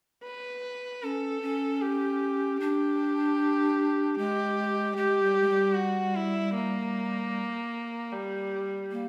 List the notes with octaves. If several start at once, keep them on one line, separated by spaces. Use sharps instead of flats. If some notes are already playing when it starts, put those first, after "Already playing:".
B4
C#4 A4
C#4
G4
D4 G4
G#3 G4
G#3 G4
G3
G#3
G3
F#4
E4
A#3
G3
A#3